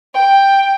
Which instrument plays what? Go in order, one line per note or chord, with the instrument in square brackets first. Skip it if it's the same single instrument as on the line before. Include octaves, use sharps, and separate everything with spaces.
[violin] G5